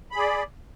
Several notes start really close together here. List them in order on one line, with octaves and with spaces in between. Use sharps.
B5 G#4 D5